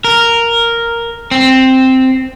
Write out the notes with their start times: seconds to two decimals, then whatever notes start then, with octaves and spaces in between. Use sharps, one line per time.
0.04 A#4
1.31 C4